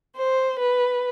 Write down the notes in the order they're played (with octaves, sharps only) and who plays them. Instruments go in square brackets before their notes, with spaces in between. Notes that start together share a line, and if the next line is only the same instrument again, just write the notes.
[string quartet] C5
B4